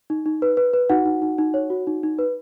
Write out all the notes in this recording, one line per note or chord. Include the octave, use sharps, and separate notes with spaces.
D#4
D#4
B4
B4
B4
D#4 F#4 F#5
D#4
D#4
D#4
C#5
F#4
D#4
D#4
B4